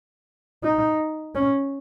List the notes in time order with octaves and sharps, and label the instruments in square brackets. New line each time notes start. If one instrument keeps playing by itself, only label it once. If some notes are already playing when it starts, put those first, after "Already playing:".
[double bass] D#4
C#4